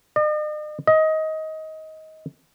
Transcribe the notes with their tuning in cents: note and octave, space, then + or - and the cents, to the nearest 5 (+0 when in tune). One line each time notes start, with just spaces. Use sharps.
D#5 -45
D#5 +20